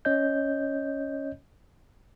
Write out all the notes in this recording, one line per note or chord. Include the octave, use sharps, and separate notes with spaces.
C#4 C#5 D#5 G6